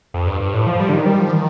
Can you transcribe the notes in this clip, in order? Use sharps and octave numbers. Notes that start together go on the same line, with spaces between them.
F2
G2
G2
A2
F3
G3
D3
D#3
G3
F3
D#3